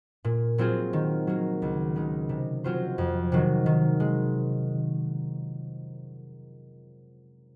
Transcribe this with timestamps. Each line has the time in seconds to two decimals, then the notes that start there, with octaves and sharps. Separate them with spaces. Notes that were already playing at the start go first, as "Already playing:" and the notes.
0.24 A#2
0.58 F#3 C4 F4 G#4
0.93 D#3
1.27 F#3 A#3
1.62 C#2
1.96 C#3 G#3 D#4
2.29 C3
2.64 F#3 C4 F4 C5
2.98 F2
3.32 C3 D#3 F#3
3.66 D#3
4.00 G#3